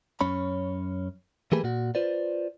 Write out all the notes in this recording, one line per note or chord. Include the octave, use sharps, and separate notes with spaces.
F#2 C#4 C#5 B5
E3 A3 A#3 G4 G#4 B4
A#2 F#4
F4 B4 C5 D5